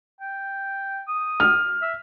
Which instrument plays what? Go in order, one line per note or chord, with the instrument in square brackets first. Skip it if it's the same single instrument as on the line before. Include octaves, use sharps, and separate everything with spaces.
[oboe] G5
D#6
[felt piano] F6
[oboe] E5